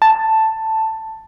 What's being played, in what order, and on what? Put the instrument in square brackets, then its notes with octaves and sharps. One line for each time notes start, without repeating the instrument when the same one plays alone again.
[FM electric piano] A5